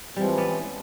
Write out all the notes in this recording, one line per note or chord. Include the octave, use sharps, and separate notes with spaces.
E3 F3 G3 G#3 C4
B3 C#4 D5